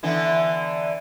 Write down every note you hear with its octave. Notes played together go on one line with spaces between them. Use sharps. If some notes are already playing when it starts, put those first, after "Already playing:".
D3 E3 B3